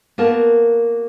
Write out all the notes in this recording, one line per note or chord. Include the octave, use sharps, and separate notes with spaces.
A#3 B3 F#4 A#4 A5